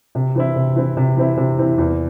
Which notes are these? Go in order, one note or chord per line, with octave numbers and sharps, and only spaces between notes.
C3
E3 C4 E4
C3
E3 C4 E4
C3
E3 C4 E4
C3
E3 C4 E4
E2